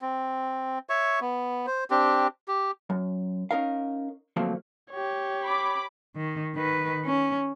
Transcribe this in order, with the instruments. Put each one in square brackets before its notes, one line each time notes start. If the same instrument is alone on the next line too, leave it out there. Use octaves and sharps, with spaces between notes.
[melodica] C4
C#5 E5 C#6
B3
C5
C4 D4 G4
G4
[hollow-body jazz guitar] F#2
C#4 D#4 A#4 F5
D2 F3 F#3 A3 A#3 C4
[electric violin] G4 C#5
[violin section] B5 D6
[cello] D#3
D#3 B4
C#4